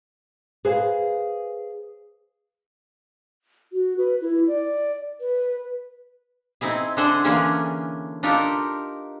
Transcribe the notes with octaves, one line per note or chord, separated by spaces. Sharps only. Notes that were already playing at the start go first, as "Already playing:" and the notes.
G#4 B4 C5 F5 G#5
F#4
B4
E4
D5
B4
C4 D#4 E4 G#4
D3 D4 G#4 C5 F#5
D3 E3 A#3 C#4 D4 G#4
D4 D#4 F4 G4 A4 A#4